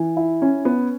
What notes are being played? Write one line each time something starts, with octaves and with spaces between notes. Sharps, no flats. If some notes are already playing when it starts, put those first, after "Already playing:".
Already playing: E3
E4
C#4
B3